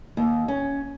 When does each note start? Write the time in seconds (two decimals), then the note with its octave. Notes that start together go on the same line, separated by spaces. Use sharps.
0.17 D#2
0.48 C#4